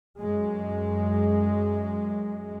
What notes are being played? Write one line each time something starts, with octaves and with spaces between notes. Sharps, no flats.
F#2 G#3